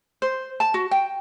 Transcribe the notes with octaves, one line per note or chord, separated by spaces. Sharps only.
C5
A5
F#4
G5